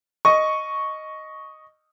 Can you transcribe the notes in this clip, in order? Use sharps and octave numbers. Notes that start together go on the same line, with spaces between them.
D#5 C#6